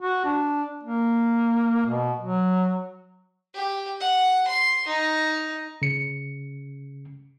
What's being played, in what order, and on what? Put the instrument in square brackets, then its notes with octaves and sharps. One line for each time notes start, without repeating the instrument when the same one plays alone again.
[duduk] F#4
D4
A#3
B2
F#3
[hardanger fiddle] G4
F#5
C6
D#4
[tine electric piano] C#3 C#7